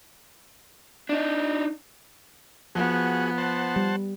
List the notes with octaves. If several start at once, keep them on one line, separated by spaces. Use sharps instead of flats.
D4 D#4
F3 B3 F#4 G#4
C5 F#5 A5
G3